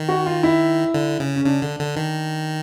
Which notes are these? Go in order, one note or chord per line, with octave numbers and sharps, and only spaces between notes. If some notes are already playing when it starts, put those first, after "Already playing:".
Already playing: D#3
F#4
F4
E4
D3
C#3
C#4
C#3 D4
D3
D3
D#3